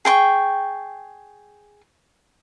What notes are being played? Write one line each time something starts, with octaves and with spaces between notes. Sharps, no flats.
G#4 G5 C6 C#6